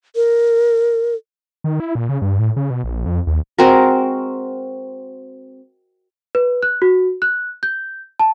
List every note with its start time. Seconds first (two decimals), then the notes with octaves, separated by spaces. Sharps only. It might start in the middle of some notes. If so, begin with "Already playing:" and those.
0.16 A#4
1.64 D#3
1.80 E4
1.95 A#2
2.09 C#3
2.22 G2
2.39 A2
2.56 C#3
2.70 B2
2.84 A#1
3.06 F2
3.27 D#2
3.58 G#3 C4 F#4 A#4
6.35 B4
6.63 F#6
6.82 F#4
7.22 F#6
7.63 G6
8.19 A5